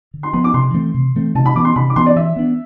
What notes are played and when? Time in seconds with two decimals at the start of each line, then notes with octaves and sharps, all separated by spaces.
0.14 D3
0.23 C6
0.33 F3 B3 C6
0.44 D6
0.54 C3 C6
0.74 E3 A3 C4
0.94 C3
1.15 E3 A3 C4
1.35 C3 A5
1.46 B5
1.55 E3 B3 D6
1.65 C6
1.76 C3 B5
1.90 D6
1.96 E3 B3 C6
2.06 D5
2.16 E3 E5
2.36 B3 D4